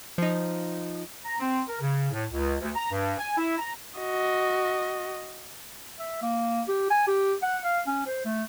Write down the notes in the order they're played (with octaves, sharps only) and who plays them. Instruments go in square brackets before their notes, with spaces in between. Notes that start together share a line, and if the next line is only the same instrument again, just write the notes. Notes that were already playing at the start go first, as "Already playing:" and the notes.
[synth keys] F3 D#4
[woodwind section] A#5
C4
A#4
C#3
A2
C#2
D2
A#5
G2
G#5
E4
A#5
[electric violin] F#4 D#5
[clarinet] E5
A#3
G4
G#5
G4
F#5
F5
C#4
C5
A3